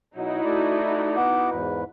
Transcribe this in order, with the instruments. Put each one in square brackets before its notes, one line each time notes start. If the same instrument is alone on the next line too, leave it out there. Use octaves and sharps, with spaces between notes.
[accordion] B2 F#3 [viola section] D#4 E4 F#4
[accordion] A3 D5
B3 F#5 D6
E2 G#2 B4